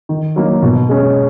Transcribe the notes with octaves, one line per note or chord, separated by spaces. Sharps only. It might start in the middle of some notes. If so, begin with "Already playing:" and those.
D#3
F#3 A#3 D#4
B2
G#3 C#4